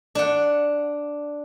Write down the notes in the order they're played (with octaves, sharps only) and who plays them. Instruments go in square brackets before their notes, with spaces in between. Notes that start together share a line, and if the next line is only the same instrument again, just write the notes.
[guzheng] D4 F#5